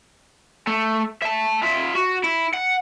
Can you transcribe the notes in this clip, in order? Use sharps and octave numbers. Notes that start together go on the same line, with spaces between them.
A3
E5 A5
F4 E5
F#4
E4
F#5